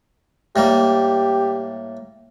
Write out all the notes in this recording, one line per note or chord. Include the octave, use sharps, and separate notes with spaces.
A2 G3 A#3 G4